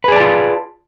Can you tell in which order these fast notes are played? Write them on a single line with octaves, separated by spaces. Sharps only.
B4 G#4 D5 A5 F4